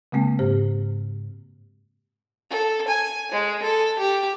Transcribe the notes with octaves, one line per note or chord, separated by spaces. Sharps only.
C#3 G#3 A#3 C4
G#2 G4 C5
A4
G#5
G#3
A4
G4